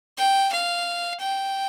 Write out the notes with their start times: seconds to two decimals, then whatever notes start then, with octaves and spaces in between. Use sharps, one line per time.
0.18 G5
0.52 F5
1.20 G5